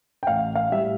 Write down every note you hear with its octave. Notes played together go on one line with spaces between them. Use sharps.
G5
A1 F5
F5
A2 G3 E5